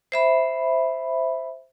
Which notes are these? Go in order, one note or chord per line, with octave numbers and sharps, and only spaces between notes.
C5 E5 B5